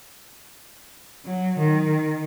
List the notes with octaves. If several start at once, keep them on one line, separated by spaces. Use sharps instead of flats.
F#3
D#3